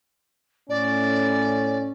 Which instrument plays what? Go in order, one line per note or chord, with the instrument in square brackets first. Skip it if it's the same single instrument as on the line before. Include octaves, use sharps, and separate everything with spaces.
[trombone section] A2 C#4 [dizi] D5